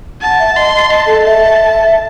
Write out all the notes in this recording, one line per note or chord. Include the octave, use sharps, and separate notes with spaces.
F#5 A5
E5
D#5 C6
D#5 A5
A4
E5 A5